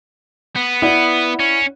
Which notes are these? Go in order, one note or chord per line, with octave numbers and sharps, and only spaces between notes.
B3
E4 D5 F#5
C#4